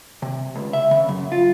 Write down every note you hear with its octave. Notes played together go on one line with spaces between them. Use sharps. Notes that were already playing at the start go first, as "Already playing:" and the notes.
C3
C#2
E5
C#3
F#2
F4